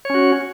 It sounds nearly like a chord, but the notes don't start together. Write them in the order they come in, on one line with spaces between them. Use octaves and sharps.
C#5 C#4 F#4